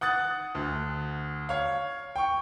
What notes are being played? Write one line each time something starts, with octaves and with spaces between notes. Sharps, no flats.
F#5 D#6 F#6 A6
D2
C#5 F5
G5 C#6